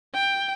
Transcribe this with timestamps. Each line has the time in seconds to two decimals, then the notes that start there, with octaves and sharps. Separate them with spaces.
0.14 G5